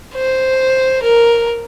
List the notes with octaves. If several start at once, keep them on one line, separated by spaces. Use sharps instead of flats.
C5
A#4